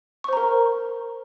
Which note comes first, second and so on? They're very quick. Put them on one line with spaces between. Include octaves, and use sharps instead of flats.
C#6 C5 A#5 A#4